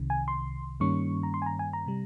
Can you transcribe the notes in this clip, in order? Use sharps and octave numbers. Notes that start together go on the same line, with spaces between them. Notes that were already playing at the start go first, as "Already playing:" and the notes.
Already playing: C2 C3 D#3
G#5
C6
G2 D#3 G3 A#3 C#4 C#6
A#5
C6
G#5
A#5
G#5
A#5
C3 G3